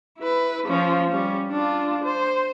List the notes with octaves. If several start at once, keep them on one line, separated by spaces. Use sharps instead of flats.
E4 B4
F3 C#4
G3 C#4
D4 F4
C5